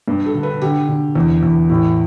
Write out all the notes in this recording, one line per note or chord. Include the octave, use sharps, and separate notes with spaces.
G2
A4
D3
B4
D3 G4
D3
E2
E2
A2